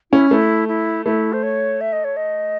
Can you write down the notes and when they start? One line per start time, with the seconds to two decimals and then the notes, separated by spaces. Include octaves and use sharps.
0.12 C#4 E4
0.31 A3 E4
0.68 E4
1.06 A3 E4
1.33 C5
1.43 C#5
1.81 E5
1.93 D#5
2.04 C#5
2.17 D#5